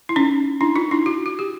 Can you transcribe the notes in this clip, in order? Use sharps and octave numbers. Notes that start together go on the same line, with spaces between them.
E4
C#4 D#4
D4 E4
D#4 F4
D4 E4
E4 F#4
F#4
G4